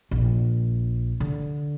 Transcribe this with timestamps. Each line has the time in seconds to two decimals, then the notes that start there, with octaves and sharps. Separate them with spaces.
0.11 A#1
1.20 D3